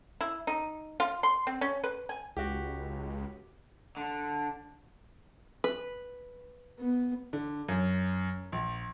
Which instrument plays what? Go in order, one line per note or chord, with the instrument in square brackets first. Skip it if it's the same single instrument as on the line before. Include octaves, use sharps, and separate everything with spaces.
[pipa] E4
D#4
F4
C6
C4
C#4
B4
G#5
[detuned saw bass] C#2 [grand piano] F#4 G4
[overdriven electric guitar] D3
[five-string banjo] B4
[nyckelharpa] B3
[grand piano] D3
F#2
A#1